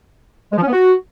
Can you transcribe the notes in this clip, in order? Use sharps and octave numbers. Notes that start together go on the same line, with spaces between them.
G#3
F3
C#4
B3
F#4